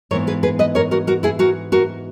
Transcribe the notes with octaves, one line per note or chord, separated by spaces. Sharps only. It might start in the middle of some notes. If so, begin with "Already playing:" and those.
G#2 E3 B3 A#4 C#5
G#4 B4
G#4 B4
B4 D#5
A#4 C#5
F#4 A#4
F#4 A#4
E4 G#4
F#4 A#4
F#4 A#4